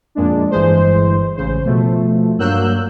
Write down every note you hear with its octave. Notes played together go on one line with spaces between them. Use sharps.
F2 A#2 G#3 D4
G1 E3 G#3 C5
A1 C#3 C5
B2 F3 A3
G2 F#3 A#3 E6 F#6 G6